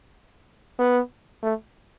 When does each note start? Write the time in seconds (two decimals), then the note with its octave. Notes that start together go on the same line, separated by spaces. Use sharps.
0.79 B3
1.43 A3